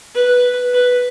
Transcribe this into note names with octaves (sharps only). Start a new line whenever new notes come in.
B4
B4